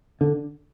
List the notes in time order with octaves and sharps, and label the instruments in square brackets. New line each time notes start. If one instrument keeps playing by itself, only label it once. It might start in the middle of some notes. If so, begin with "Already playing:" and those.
[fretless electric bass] D3